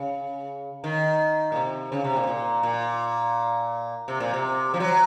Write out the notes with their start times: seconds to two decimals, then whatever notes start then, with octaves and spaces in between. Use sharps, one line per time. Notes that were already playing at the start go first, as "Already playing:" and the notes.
Already playing: C#3
0.84 D#3
1.52 A#2
1.56 C3
1.92 C#3
2.04 C3
2.16 A#2
2.27 A#2
2.63 A#2
4.08 C3
4.20 A#2
4.34 C3
4.74 F3
4.80 F#3